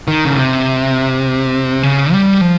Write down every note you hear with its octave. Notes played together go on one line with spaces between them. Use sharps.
D#3
C#3
C3
C#3
G3
F3